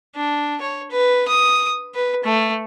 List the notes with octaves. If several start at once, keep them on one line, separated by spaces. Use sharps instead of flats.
D4
C#5
B4
D#6
B4
A3